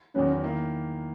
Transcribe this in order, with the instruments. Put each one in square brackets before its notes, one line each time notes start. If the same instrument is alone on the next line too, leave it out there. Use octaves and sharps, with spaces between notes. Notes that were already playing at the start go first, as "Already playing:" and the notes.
[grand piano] E2 D#3 F#3 B3 [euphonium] C#4
[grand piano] D#3 A#3 E4